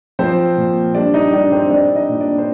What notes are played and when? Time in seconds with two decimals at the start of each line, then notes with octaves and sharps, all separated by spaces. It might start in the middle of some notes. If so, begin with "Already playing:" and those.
0.19 F3 C4 C5
0.57 A#2
0.94 G3 D4 D5
1.14 D#4 D#5
1.32 G3 D4 D5
1.52 C4 C5
1.70 C4 D4 D5
1.96 D#4 D#5
2.09 A#2
2.21 D4 D5
2.38 C5